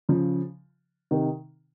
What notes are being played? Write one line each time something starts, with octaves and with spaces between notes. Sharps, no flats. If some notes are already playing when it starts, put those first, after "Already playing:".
C#3 F3
C3 D#3